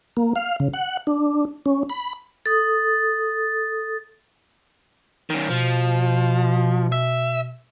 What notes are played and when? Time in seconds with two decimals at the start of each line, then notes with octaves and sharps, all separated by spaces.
0.17 A#3
0.36 F5
0.60 C#3
0.74 F#5
1.07 D4
1.66 C#4
1.89 B5
2.46 A4 D#6 A6
5.30 D#3 C#4
5.49 B2 F3
6.92 E5